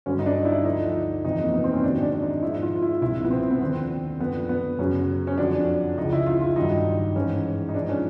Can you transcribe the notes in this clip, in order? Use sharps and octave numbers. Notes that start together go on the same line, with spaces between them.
G2 D3 F#3 C#4
D#4
D4
E4
D2 D3 F3 D#4
F2 C3 E3 D#4
A#3
B3
C4
C#4
G#2 D#3 F#3 D4
D4
D#4
G#2 F3 E4
F4
E4
C2 C3 F3 E4
B3
C4
B3
D#2 D3 F3 C4
F#2 D3 F3 B3
B3
F#2 C#3 F#3 C#4
C#4
F2 D3 F#3 D4
C#2 C#3 F3 D#4
E4
F4
F4
G2 D#3 F#3 D#4
G#2 E3 C#4
D#4
G#2 F3 D4
C#4